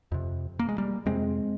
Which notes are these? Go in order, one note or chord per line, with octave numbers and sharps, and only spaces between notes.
F2 C3
A#3
G#3
G3 A#3
F2 C3 G#3 C4